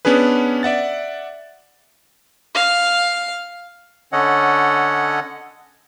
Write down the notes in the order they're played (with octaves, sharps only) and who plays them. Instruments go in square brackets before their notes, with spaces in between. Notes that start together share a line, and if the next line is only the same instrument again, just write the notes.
[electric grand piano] B3 C#4 D4 G#4 B4
D5 E5 F#5 A6
[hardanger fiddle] F5
[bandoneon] D3 C#4 A4 C#5 D#5 F#5